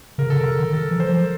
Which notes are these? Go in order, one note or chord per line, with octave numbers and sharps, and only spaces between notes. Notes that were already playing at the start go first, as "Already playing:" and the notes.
C#3 A#4
C#3 A4
C#3 A#4
D3
D#3 A4
E3
C5
F3